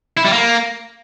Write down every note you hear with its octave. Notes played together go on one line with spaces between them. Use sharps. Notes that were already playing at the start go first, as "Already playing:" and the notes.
E4
G3
A#3